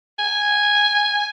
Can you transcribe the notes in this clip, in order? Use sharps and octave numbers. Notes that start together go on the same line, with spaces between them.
G#5